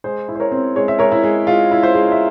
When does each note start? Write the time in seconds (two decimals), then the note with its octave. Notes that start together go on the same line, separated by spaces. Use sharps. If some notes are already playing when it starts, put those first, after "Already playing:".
0.04 G#3 G#4 C5
0.28 E4
0.35 C5
0.40 A#4 C#5
0.52 C4
0.76 G#3 C#5
0.88 E5
0.99 G#3 A#4 C#5
1.12 E4
1.23 G#3
1.47 G#3 F4
1.71 E4
1.82 C5 E5
1.94 G#3
2.12 E5